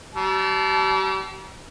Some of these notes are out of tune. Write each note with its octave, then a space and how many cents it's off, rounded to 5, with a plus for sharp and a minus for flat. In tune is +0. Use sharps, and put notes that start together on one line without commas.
G3 -40 A5 -15